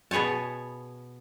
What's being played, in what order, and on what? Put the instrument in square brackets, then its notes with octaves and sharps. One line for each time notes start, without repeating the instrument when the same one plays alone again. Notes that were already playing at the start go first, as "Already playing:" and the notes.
[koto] B2 B3 G#4 C#5 A5